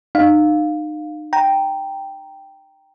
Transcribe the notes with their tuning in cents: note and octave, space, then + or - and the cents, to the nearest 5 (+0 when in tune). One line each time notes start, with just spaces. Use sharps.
D#4 -35 F5 +10
G5 +0 A#5 +0